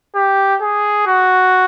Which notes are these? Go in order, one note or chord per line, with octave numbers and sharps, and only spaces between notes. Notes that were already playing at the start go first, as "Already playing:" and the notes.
G4
G#4
F#4